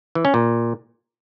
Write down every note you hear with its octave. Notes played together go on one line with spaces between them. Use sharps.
E3
C#4
A#2